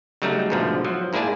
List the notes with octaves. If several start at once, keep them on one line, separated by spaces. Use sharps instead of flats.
C#3 F#3 G3 A3 D#4
G#2 B2 D3 F3 A3
F3 F#3
G#2 A#3 E4 G#4 D5 A5